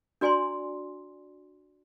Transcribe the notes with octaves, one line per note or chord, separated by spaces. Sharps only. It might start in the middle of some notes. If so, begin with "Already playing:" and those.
D4 F#4 D5 G#5 A#5 C6